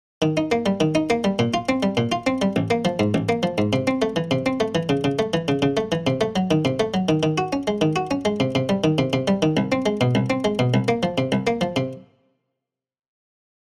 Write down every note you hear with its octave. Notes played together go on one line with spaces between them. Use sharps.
D#3
D#4
A#3
G3
D#3
D#4
A#3
G3
A#2
F4
C4
G3
A#2
F4
C4
G3
A1
A#3
F3
G#2
A1
A#3
F3
G#2
C3
C4
A3
E3
C3
C4
A3
E3
C#3
C#3
A3
E3
C#3
C#3
A3
E3
C3
A3
F#3
D#3
C3
A3
F#3
D#3
D#3
F#4
C#4
G#3
D#3
F#4
C#4
G#3
C3
C3
G3
D#3
C3
C3
G3
D#3
C2
C4
G#3
B2
C2
C4
G#3
B2
C2
A#3
F3
C3
C2
A#3
F3
C3